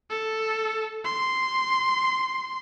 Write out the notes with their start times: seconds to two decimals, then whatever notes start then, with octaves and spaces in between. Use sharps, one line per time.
0.10 A4
1.05 C6